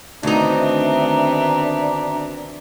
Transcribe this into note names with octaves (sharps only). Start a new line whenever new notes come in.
D2 D#3 B3 C4 D4 D#4 E5 A#5